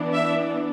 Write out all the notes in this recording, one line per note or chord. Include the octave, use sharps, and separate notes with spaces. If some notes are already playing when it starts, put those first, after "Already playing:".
Already playing: E3 B3 D4
E5